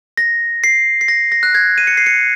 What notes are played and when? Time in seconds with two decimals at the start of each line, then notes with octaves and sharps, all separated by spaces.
0.17 A#6
0.64 C7
1.01 C7
1.08 A#6
1.32 A#6
1.43 F#6
1.55 G#6
1.78 D#7
1.87 C#7
1.97 C7
2.06 C#7